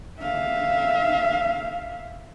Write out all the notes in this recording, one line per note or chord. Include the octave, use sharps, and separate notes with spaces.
E5 F5